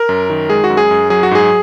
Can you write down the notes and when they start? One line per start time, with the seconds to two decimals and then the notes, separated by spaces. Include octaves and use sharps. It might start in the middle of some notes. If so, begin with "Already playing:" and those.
Already playing: A#4
0.09 F#2
0.30 D#3
0.50 G#3 G#4
0.64 F#4
0.70 F#2
0.77 G#4
0.91 F#2
1.10 F#3 G#4
1.23 F#4
1.31 G#2 G#4